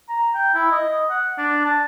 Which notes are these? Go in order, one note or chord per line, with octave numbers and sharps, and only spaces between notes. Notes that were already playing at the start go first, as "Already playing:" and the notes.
A#5
G5
E4
D#5
F#5
D4
A5